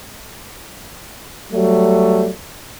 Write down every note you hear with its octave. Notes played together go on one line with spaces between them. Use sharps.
F#3 G3 A3